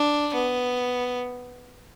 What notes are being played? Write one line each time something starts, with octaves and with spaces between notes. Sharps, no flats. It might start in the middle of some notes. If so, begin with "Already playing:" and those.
Already playing: D4
B3